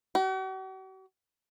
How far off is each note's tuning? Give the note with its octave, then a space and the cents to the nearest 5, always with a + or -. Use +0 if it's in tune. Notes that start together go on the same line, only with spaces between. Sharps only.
F#4 +45